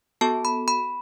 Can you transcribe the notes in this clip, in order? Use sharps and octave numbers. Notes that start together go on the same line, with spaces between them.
B3 F#4 A4 A5
B5
B5